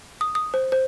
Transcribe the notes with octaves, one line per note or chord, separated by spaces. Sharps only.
D#6
D#6
C5
C5